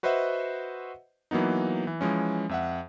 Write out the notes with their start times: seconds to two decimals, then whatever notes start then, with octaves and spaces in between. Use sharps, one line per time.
0.03 F#4 B4 C5 D#5 E5 F#5
1.31 E3 F#3 A#3 B3 D#4
1.87 E3
2.01 E3 F3 G#3 C#4
2.49 F2 E5 F#5